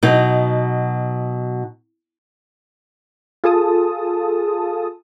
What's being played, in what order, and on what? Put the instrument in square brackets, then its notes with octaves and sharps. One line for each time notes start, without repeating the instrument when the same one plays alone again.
[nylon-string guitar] B2 F#3 D#4
[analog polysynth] F4 G#4 A4 A5 D#6